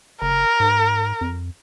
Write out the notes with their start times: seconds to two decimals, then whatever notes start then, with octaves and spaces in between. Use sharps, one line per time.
0.22 F#1 A#4
0.60 G#2
1.21 F2